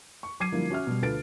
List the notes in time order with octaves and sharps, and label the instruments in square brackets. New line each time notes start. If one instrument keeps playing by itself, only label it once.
[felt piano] C#6
F#3 D6 G#6 C7 D#7
D3 F3 G3 A#3 E4
C#4 F#4 E5 F6
B2 G3
D2 F4 A4 B4 A6 D7